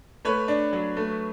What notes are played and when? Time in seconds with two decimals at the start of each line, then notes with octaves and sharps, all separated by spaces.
0.25 A3 B4 C#5
0.48 D4
0.73 F#3
0.97 A3